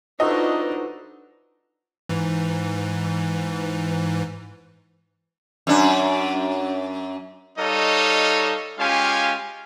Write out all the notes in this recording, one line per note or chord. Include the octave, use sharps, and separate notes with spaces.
F3 F#3 A3 D4 D#4 B4 D#5
G#2 E3
F#2 D4
G3 D#4 A4 C#5 D#5 F5
G#3 C#4 F4 G4 F5 G#5